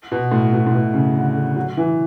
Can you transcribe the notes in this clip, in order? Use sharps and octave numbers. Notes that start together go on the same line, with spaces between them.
B2
A2
B2
A2
B2
C#3
D3
D3
F#3
E3